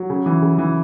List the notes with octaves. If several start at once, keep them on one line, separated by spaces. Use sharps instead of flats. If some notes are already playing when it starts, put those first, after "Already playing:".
Already playing: F#3
C#3
E3
C#3
E3